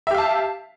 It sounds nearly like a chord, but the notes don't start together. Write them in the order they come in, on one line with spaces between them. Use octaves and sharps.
E5 G4 F5 A5